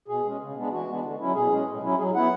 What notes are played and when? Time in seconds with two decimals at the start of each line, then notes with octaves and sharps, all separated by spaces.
0.08 B2 G#4
0.24 G#3 C#4
0.40 C#3
0.57 G#3 B3 D4
0.72 E3 F#4
0.88 G#3 B3 D4
1.03 D3
1.19 F#3 C#4 E4
1.35 B2 G#4
1.51 G#3 C#4
1.67 A2
1.82 F#3 C#4 E4
1.98 F#3 G#4
2.15 B3 E4 F#5